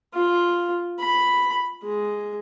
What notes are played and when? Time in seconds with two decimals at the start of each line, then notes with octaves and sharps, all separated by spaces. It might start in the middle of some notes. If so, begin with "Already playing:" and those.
0.13 F4
0.99 B5
1.83 G#3